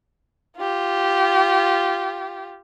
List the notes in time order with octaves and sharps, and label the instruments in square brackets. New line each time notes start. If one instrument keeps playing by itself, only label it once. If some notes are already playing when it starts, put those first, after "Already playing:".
[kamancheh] F4 G4